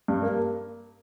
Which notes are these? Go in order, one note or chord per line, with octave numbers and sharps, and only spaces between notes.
G2
A#3